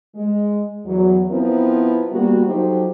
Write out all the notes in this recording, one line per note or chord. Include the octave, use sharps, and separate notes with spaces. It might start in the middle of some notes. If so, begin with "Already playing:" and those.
G#3
E2 F#3
F3 B3 C4 E4 A#4 B4
D3 G3 A#3 B3 F#4
F3 F#3 D#4 G4 A4 C5